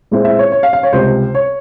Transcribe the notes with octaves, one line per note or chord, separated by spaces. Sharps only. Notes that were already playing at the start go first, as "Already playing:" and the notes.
A#2 G#3 C4 E4
E5
C#5
C#5
F5
F5
C#5
C#2 C3 G3 C4 C5
C#5